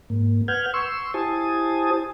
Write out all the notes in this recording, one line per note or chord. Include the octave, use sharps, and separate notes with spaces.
G#2 A#3
B4 F#5 F6 G6 G#6
C6 C#6 E6
E4 G4 C5 G#5 A5 D#6